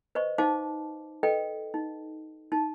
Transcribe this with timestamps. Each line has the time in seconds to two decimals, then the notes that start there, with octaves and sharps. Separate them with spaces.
0.15 B4 C5 D#5 C#6
0.38 D#4 C5 F5 A5 D6
1.23 A4 B4 D#5 G5
1.74 D#4
2.52 D#4 A5